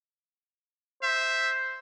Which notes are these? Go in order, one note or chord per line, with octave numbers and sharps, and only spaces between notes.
C5 E5